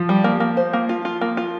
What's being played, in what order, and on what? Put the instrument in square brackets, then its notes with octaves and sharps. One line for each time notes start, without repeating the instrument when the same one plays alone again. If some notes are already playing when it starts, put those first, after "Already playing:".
Already playing: [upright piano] F3
[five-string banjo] G3
A#3
A#3
C5
A#3
F4
F4
A#3
F4